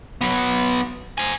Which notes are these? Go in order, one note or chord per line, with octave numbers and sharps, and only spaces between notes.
F#3 B3
C5 G#5